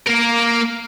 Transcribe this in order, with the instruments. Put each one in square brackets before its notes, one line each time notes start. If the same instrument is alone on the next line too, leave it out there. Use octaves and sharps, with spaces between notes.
[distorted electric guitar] A#3 A#4